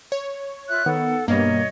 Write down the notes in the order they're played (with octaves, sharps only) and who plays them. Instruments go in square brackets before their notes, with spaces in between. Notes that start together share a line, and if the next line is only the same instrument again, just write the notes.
[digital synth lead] C#5
[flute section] F4 E5 F#6
[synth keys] D#3 B3 [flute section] A4 F#5
[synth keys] G2 B2 G3 [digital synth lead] A#3 [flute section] C#5 D#5